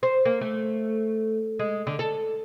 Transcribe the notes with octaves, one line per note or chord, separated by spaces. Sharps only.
C5
A#3
A3
G#3
D3
A4